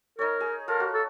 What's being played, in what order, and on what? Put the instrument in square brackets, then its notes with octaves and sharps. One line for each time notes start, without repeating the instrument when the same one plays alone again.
[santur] D#4 C#5 [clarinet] A#4
[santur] G#4
[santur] F4 A4 [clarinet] A#4
[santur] F#4
[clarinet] A4